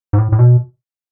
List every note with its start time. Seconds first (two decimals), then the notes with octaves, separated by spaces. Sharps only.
0.13 G#2
0.18 A2
0.32 A2
0.39 B2